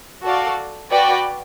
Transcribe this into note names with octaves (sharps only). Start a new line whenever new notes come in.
F#4 A4 D5 F5
F#4 B4 D5 G5